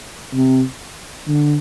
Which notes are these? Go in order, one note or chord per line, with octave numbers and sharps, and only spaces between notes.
C3
D3